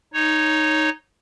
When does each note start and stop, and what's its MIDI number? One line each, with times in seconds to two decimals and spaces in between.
0.14 0.89 63
0.14 0.89 73